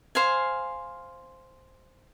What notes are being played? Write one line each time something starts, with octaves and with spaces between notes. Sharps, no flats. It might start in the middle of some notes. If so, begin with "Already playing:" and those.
C5 F5 G#5